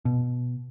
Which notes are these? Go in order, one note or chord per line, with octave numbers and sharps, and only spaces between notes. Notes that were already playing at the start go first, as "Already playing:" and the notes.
B2